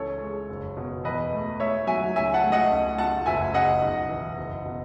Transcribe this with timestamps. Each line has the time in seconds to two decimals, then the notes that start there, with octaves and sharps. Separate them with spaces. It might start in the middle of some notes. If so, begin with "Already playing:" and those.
Already playing: C#2 E3 A4 C#5
0.21 G#3
0.49 F#1
0.77 B2
1.04 E2 B4 D#5
1.33 A3
1.60 A3 C#5 E5
1.87 F#3 E5 G#5
2.15 C#2 E5 G#5
2.34 F#5 A5
2.44 A3
2.52 D#5 F#5
2.71 C#2
2.98 A3 F#5 A5
3.26 F#1 E5 G#5
3.54 C#3 D#5 F#5
3.81 B1
4.09 E3
4.37 F#1
4.65 B2